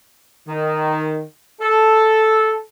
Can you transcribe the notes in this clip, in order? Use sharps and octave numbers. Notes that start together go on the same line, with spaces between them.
D#3
A4